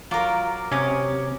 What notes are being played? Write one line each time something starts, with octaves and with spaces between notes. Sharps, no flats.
F#3 F4 A#4 D6
C3 C#4 C#5 D6 D#6